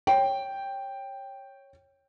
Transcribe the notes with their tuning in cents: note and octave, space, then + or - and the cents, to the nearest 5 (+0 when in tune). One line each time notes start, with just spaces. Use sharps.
C#5 -10 G5 +0